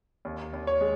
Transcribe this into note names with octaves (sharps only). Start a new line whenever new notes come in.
D#2
D#2
C#5
G#3